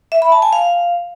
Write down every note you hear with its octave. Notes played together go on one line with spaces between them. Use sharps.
E5
B5
A5
G#5
F5